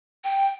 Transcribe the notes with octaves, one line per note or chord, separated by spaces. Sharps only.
G5